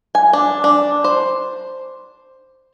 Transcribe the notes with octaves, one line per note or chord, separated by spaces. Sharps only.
G#5
D4
D4
C5